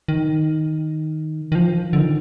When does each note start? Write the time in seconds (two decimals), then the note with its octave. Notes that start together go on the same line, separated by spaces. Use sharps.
0.08 D#3
1.52 D#3
1.55 F3
1.93 D3
2.00 D#3